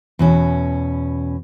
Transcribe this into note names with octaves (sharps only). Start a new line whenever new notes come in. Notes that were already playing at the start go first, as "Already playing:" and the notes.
E2 B2 C#4